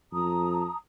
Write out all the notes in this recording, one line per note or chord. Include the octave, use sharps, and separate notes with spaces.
F2 A5 A#5 D#6